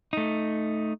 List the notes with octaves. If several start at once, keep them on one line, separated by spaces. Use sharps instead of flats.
A3 D#4